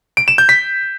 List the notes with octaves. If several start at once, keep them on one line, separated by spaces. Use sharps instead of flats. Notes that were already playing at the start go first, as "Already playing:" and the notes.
D7
E7
G6
B6